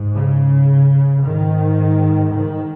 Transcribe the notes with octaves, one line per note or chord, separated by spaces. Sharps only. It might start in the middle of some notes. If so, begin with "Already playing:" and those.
Already playing: G#2
C#3
G#2 D#3
D#3